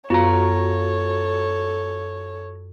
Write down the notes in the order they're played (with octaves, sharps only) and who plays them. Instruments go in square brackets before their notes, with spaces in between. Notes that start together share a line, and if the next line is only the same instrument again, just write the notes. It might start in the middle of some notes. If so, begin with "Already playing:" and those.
[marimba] F#2 [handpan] B3 F4 [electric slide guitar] F#4 A#5 [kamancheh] A4 C#5